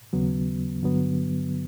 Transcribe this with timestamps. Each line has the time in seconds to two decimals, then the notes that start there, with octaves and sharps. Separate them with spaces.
0.13 D#2 C#3 F#3 B3
0.82 G2 D3 F#3 B3